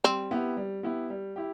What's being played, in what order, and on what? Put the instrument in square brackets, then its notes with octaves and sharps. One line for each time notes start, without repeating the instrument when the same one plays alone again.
[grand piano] G3 [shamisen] C4
[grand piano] B3 E4 G4
G3
B3 E4 G4
G3
E4 G4